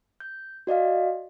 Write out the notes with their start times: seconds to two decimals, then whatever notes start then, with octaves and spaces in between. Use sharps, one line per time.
0.20 G6
0.67 F#4 D5 D#5 F5